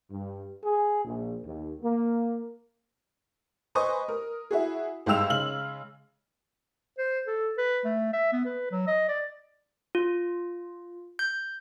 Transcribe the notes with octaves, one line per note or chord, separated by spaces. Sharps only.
G2
G#4
A#1
D#2
A#3
B4 C5 D#5 G#5 C#6 D#6
A#4
E4 F#4 G#4
G#1 G2 G#3 G5 E6 F7
C#3 G#3 F6 F#7
C5
A4
B4
A3
E5
B3
B4
F#3
D#5
D5
F4
G6